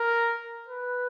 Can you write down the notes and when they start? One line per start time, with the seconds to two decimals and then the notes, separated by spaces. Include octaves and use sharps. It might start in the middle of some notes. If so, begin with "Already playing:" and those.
Already playing: A#4
0.68 B4